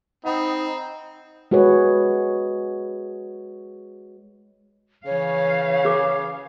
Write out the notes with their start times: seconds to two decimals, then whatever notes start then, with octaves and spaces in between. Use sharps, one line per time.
0.25 C4 D#4 F#5 B5 D#6
1.51 G#3 F#4 G#4 B4 C#5
5.06 C#3 E3 C#5 F5
5.85 G#4 D6